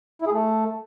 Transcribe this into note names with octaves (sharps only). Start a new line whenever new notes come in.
E4
G#4
A3